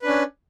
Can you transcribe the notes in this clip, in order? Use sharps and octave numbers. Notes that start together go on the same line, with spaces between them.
C#4 D4 B4